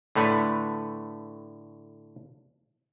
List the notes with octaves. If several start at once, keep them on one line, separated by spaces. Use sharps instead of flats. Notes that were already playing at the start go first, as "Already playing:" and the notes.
A2 D3 A3 B4 F#5